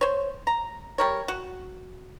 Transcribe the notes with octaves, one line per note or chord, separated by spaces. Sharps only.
C5 C#5
A#5
G3 A#4 C#5
F#4